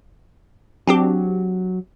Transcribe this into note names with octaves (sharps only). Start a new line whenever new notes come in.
F#3 C4 D4 G4